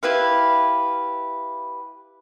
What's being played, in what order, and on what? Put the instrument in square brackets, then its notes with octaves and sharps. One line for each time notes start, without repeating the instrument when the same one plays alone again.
[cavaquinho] E4 G4 B4 F5